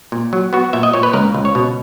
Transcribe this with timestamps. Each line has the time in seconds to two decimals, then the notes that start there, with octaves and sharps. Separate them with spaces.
0.12 A#2
0.33 F#3
0.53 B3 F#4
0.73 A#2 E5
0.83 D#5
0.93 A#2 C#5
1.03 B4
1.13 C#2 A#4
1.35 C#2
1.45 C#5
1.55 B2